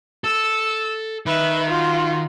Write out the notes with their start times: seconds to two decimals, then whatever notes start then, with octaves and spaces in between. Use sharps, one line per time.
0.24 A4 E6
1.26 D#3 B4 E5
1.70 F4 F#4